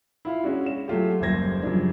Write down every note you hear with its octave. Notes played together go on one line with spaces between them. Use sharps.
E4 F4 F5
G#3 C#4 D4 F#4
E7
F#3 A3 F4 G4
F#1 D#2 G3 C5 G#6 A#6
F#2 C#3 F3 G3 D4